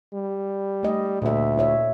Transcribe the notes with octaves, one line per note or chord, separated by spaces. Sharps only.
G3
A3 D#5
D2 A#2 E5
E4 C#5 E5